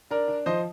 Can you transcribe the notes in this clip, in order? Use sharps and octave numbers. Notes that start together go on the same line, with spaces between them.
D4 A#4 D5
D4
F3 C5 D#5